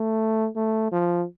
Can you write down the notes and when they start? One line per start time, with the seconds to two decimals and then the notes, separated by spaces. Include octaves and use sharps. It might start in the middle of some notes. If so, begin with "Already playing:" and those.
Already playing: A3
0.56 A3
0.92 F3